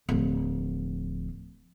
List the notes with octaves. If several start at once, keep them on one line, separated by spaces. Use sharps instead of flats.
D1 F3